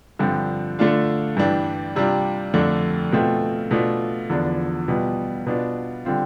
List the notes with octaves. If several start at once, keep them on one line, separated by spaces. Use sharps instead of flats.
G2 D3 F3 C4
D3 A3 D4 F4
G2 E3 G3 D4
C3 G3 D4 F4
F2 D3 A3 D4
B2 A3 C4 F4
B2 A3 D4 F4
E2 D3 F3 B3 D4
B2 G3 B3 F4
B2 B3 D4 F4
D3 G3 C4 F4